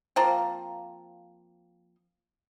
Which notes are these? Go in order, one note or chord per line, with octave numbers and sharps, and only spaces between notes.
F3 A#3 C4